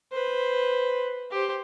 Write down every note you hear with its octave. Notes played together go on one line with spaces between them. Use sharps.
B4 C5
G4 C5